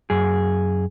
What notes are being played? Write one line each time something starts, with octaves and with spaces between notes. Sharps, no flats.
F#2 G#4